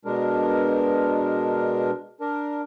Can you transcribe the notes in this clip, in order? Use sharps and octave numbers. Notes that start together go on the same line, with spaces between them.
B2 G#3 D4 A#4
D4 A#4